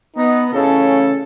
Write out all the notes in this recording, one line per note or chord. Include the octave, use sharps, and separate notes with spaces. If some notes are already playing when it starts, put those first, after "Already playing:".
B3 D#4
A1 C#3 C#4 A4